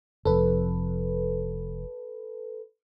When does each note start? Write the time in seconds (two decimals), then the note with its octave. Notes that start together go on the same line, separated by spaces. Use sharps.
0.25 F1 F2 A4 B4